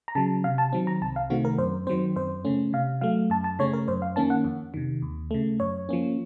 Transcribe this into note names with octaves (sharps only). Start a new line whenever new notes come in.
A#5
C#3 F#3 A5
C3 F5
A5
D#3 F#3 C4
A#5
C2 A5
F5
C3 D#3 A3 C4 F#4
A#4
F#2 C5
D#3 F#3 C4 C5
F#2 C5
C#3 A3 C#4
C3 F5
F#3 A3 F5
F#2 A5
A5
C#3 A3 C#4 C#5
A#4
F#2 C5
F5
D#3 A#3 C#4 A5
F#5
F2
C3 D#3
D#2
C#3 A3
F#2 C#5
F3 A#3 C#4